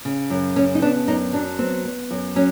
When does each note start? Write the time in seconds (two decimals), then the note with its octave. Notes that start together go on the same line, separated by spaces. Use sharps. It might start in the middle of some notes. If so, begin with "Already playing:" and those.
0.05 C#3
0.30 F#2
0.56 C#3 C#4
0.75 D#4
0.82 B3 D4
1.08 F#2 D#4
1.33 F#3 D4
1.59 B3 C4
1.85 B3
2.11 F#2
2.36 F#3 C#4